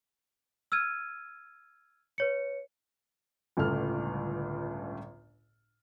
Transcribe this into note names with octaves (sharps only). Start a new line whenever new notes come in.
E6 F6 G#6 D#7
B4 C#5 C#7
G1 C#2 A2 A4 F6